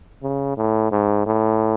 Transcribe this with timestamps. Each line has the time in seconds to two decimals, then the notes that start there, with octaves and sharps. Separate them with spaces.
0.23 C#3
0.57 A2
0.91 G#2
1.26 A2